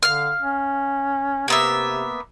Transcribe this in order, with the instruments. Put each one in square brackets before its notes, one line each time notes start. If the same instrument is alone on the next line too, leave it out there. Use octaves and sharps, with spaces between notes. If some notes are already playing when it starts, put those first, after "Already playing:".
[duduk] D3 [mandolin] F5 F6
[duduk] C#4
[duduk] C3 [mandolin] A#3 B3 E5